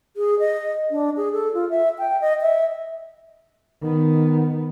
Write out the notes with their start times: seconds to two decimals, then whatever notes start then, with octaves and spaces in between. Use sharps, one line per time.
0.17 G#4
0.39 D#5
0.91 D4
1.17 G#4
1.33 A4
1.54 F4
1.70 E5
1.98 G5
2.21 D#5
2.41 E5
3.82 D#3 B3